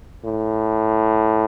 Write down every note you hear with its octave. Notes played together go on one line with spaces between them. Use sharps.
A2